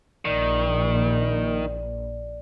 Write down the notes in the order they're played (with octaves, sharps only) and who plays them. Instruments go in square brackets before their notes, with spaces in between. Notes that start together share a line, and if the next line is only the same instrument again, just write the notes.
[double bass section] A#1 [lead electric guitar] D#3 [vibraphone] D5